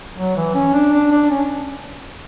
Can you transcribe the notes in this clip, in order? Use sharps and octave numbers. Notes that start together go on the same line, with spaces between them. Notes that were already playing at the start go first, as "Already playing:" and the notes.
F#3
E3
C#4
D4
D4
D4
C#4